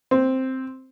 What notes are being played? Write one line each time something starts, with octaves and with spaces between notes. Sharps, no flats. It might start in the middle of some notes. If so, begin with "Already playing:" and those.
C4